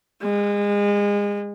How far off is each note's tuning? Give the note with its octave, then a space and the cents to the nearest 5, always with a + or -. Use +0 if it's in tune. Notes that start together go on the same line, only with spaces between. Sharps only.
G#3 -30